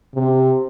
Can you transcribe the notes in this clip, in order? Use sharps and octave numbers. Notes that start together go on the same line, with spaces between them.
C3